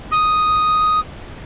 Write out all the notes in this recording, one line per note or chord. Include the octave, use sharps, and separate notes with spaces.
D#6